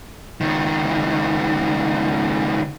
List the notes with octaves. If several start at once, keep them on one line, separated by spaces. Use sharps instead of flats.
C#2 D#3